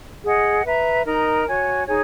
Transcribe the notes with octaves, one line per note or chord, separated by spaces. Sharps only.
G#4 D#5 F#5
B4 E5 A#5
D#4 A#4 D#5 A#5
F#4 C#5 G#5
D#4 G#4 C#5 G#5